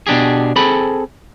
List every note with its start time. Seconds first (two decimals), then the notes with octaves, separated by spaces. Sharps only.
0.07 B2 D4 G4 G#4
0.56 C4 G#4 A4 B5